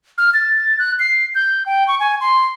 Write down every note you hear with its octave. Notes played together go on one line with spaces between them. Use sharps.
F6
A6
F#6
C7
G6
G5
C#6
G#5
C6